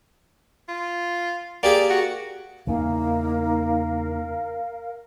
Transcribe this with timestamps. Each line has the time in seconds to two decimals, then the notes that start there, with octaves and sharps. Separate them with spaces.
0.68 F4
1.63 A#3 G4 G#4 D5
1.90 F#4
2.67 E2 C#3 A#3 D#4 A#4 F5